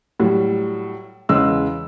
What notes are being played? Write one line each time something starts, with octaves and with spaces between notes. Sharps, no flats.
A2 F#3 G3
E2 C#3 G#3 E6